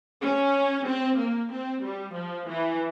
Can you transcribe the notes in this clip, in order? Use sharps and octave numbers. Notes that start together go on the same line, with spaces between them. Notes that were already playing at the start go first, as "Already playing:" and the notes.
C#4
C4
A#3
C4
G3
F3
E3